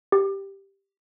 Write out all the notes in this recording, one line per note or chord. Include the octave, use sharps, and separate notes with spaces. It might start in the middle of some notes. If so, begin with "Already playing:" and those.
G4